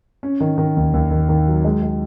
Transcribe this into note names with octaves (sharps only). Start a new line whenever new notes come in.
C#4
D#3
D#3
D#2
D#2
D#3
D#3
F#3
G#3
G#3